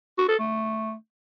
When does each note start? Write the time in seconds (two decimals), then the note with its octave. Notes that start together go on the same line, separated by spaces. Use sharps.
0.18 F#4
0.28 A4
0.39 A3